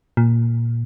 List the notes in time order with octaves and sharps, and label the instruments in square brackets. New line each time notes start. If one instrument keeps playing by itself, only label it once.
[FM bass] A#2